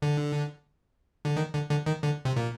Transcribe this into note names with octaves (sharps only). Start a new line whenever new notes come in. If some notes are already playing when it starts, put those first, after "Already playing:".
D3
D3
D#3
D3
D3
D#3
D3
C3
A#2